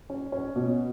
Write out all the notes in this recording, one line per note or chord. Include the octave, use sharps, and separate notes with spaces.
C#4
C#4
B2